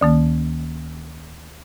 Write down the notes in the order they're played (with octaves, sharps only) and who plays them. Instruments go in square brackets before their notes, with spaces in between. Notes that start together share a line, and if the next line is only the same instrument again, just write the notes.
[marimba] D2 D#3 A#3